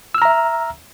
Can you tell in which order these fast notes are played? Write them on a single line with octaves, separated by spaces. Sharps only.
E6 F6 A#5 E5